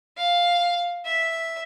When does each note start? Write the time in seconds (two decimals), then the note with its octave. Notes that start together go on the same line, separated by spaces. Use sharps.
0.18 F5
1.06 E5